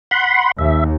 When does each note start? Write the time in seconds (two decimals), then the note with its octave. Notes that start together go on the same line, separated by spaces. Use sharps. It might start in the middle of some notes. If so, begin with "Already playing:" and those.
0.11 F#5 B5 C6
0.59 D#2 E5